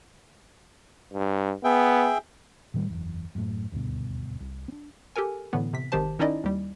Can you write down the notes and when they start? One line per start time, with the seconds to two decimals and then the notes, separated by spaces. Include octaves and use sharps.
1.13 G2
1.64 B3 G#4 E5 G5
2.74 A2 D#3 E3 G3
2.90 F#1 E2
3.35 F#2 A2
3.72 D#1 D2 G2 B2
4.40 C2
4.68 C4 D4
5.16 G4 A4 A#4 G#5
5.53 A2 D3 E3 B3
5.73 C3 B6
5.92 G#1 D#3 G4 C5 A5
6.19 D#3 C#4 D#4 E4 D5 D#5
6.44 D#2 G3